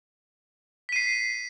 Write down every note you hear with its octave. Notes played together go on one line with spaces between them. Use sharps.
B6 C7 D#7